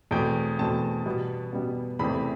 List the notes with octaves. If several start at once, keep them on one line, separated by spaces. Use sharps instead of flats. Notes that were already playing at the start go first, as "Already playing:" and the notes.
E2 B2 A3 C4 G5
E2 B2 A3 C4 A5
B2 G3 B3
B2 G3 B3
E2 C3 E3 A3 C4 B5